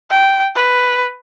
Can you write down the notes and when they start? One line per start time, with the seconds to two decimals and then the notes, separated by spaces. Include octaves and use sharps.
0.11 G5
0.56 B4